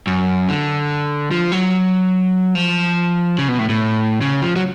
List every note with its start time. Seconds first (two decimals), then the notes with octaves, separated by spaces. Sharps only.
0.07 F#2
0.49 D3
1.31 F3
1.52 F#3
2.55 F3
3.39 C#3
3.48 B2
3.59 A2
3.69 A2
4.21 C#3
4.42 F3
4.56 F#3